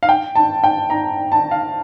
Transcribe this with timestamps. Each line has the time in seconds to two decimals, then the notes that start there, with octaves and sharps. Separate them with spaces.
0.03 F5
0.09 G5
0.36 A5
0.64 G5
0.90 A#5
1.32 A5
1.51 F5